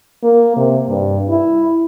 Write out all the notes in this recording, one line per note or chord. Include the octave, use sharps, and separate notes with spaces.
A#3
C3
G2
E4